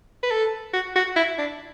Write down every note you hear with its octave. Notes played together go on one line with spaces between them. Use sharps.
B4
A4
F#4
F#4
E4
D4